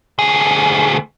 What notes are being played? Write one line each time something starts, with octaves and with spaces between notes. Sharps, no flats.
D2 G#4